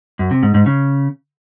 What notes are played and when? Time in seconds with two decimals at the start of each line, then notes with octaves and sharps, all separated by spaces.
0.19 F#2
0.31 C3
0.43 G#2
0.54 G#2
0.66 C#3